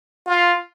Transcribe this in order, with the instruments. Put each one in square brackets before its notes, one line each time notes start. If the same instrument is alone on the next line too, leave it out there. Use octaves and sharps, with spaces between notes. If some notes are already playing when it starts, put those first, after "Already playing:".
[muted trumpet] F4